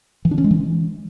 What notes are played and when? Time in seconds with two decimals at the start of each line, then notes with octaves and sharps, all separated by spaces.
0.25 E3
0.31 D4
0.38 C#4
0.44 G#3
0.51 E3